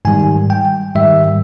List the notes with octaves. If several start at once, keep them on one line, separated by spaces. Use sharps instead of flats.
G#2 D#3 G3 G#5
G5
G#2 D#3 G3 E5